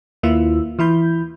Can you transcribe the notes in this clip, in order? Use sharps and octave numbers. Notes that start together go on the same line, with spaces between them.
D#2 A#3 E4 F4 E6
E3 E4 B5 G6